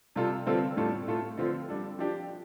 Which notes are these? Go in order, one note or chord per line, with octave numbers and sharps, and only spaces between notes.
C3 G3 F4 A4
D3 G3 C4 F4 A4
A2 G3 F4 A4
A2 A3 F4 A4
D3 F3 C4 F4
G3 D4 A4
F3 D4 G4